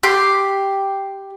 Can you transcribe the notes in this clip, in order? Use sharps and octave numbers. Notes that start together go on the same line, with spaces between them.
G4 C6